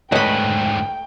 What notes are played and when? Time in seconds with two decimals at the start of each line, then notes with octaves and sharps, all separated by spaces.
0.12 D2 G#2 A3 B4 C#5 D#5 G5 B5